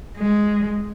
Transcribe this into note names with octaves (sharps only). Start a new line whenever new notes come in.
G#3